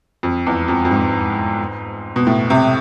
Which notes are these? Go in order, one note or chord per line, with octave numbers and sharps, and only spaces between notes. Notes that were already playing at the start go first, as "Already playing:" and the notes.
F2
E2
F2
F2
G#2
B2
A2
C3